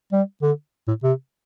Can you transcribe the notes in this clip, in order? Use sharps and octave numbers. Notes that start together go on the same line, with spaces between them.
G3
D3
A2
C3